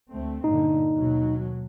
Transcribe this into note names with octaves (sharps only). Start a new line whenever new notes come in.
D2 A3 C4
G2 A#2 D3 D#4
D#2 B2 F#3